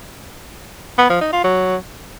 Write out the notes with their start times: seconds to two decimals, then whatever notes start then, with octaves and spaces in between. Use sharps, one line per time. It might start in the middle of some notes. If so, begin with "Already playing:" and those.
0.99 B3
1.10 F3
1.21 D#4
1.33 F4
1.44 F#3